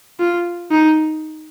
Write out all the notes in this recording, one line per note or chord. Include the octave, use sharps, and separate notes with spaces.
F4
D#4